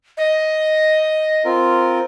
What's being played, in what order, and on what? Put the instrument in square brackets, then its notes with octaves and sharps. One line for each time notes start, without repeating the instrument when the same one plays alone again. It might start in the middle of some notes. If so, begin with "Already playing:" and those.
[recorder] D#5
[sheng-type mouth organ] C4 F4 A#4